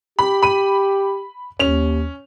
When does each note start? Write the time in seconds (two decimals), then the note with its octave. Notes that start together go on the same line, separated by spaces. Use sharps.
0.19 G4 B5
0.43 B5 D#7
1.59 D#2 C#4 F7